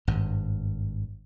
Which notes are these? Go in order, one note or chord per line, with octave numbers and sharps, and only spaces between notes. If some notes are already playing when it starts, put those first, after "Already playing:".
G#1 G2